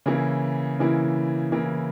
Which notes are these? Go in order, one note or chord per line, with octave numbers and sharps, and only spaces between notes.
C#3 E3 A#3 E4
C#3 E3 A#3 E4
C#3 E3 A#3 E4